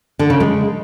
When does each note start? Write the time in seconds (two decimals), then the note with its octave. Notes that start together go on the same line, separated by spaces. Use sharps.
0.19 D3
0.30 C#3
0.40 G#3